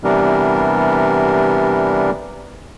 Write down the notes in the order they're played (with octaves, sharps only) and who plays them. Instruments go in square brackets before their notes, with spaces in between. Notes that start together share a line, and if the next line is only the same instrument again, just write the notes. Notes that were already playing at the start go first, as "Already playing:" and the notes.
[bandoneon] C3 E3 G3 B3 D4 A#4